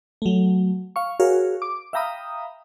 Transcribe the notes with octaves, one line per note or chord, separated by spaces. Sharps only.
F#3 A3
F5 C#6
F#4 G#4 A#4 C#5 F5
D6
E5 F5 G5 A#5 B5 D#6